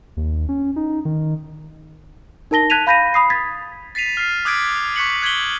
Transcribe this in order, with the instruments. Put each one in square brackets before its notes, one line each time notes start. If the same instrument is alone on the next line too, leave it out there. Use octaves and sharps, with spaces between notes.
[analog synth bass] D#2
C#4
D#4
D#3
[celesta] D#4 A#4 A5 A#6 G7
A5 F#6 G#6 B6 D#7 F7
F5 B5 G6 A#6 B6 D#7
B5 D#6 C7
G#6 A6 B6
[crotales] A6 B6 C7 D#7 F7
F6 C7
D6 D#6 F#6 G#6 B6 D7
C#6 F#6 B6 C#7 F#7
F#6 G#6 B6 F#7 G7